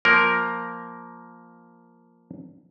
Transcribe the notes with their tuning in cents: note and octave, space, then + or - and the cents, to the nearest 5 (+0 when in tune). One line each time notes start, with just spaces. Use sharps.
F3 +0 A#3 +0 A#4 +0